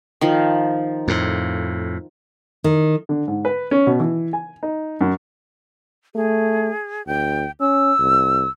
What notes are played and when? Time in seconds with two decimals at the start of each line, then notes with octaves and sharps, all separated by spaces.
0.21 D#3 F3
1.08 F2 A2
2.64 D#3
3.09 D3
3.28 G#2
3.45 B4
3.71 C#4
3.87 B2
4.00 E3
4.33 G#5
4.63 D#4
5.01 F#2
6.15 A3 G#4
7.06 D2 G5
7.60 C#4 E6
7.99 C2